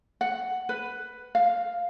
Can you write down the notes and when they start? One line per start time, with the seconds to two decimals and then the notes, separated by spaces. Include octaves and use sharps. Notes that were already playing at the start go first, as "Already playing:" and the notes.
0.21 F#5
0.69 B4
1.35 F5